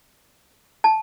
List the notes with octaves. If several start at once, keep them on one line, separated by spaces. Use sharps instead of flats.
A5